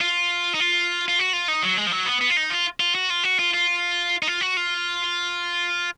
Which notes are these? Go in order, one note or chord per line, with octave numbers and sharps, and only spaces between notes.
F4
D#4
F4
F4
F#4
F4
D#4
F#3
G#3
F3
F#3
B3
B3
F4
D#4
F4
F4
F#4
F4
F#4
F4
F4
D#4
F4
F#4
F4